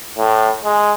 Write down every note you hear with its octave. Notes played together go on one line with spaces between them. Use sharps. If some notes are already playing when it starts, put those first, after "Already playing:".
A2
G#3